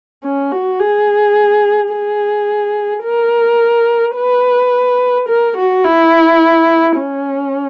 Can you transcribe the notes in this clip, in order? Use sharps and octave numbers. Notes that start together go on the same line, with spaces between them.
C#4
F#4
G#4
G#4
A#4
B4
A#4
F#4
E4
C#4